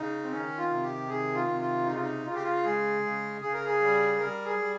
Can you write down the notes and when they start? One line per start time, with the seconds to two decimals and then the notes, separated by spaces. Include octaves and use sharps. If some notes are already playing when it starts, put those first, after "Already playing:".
Already playing: C#3 D#4
0.23 C4
0.31 D#3 C#4
0.57 F4
0.70 C3
0.83 G4
1.09 D#3 G#4
1.35 F4
1.48 C3
1.61 F4
1.86 C#3 D#4
1.94 F4
2.01 D#4
2.25 C#3 F4
2.34 G4
2.43 F4
2.64 G#3 G#4
3.03 C#3
3.41 C#3 G#4
3.53 A#4
3.65 G#4
3.81 G3
4.19 G3 A#4
4.45 G#4
4.58 G3